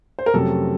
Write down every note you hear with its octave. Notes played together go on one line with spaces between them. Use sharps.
C5
A#4
F2 C3 F#3 A3 C#4 A4